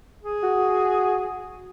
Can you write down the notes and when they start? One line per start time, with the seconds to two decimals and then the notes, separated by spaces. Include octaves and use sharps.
0.23 G#4
0.43 F#4